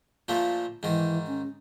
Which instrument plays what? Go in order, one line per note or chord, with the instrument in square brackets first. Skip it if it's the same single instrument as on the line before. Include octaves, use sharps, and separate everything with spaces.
[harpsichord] A#2 F3 A3
[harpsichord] G#2 D#3 [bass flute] E3
[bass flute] C#4